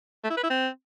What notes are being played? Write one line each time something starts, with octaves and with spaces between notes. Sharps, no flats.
A3
E4
B4
E4
C4